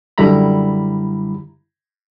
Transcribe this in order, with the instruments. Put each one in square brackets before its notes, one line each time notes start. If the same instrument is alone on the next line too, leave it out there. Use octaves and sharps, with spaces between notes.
[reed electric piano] F#2 D3 G3 E4 A#5 B5